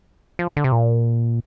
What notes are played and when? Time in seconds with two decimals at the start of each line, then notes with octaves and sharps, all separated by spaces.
0.39 F3
0.57 D3
0.64 C3
0.72 A#2